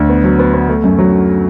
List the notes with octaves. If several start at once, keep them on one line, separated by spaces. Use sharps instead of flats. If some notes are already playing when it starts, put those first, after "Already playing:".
Already playing: D2
B3
F#3
B3
B3
A3
F#2
F#3